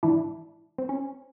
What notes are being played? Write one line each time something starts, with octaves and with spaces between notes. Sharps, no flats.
G#2 E3 D4 E4
C4
C#4